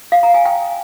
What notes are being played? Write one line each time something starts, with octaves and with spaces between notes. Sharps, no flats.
F5
A#5
G#5
G5